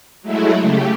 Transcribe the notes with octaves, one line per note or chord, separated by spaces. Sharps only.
F#3 G#3 A3 E4
C#3 A3 G4